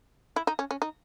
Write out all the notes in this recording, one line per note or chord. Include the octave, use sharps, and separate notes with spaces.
E4
D#4
C#4
C#4
D#4